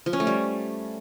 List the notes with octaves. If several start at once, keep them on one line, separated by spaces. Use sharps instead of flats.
F3
C#4
A3
G3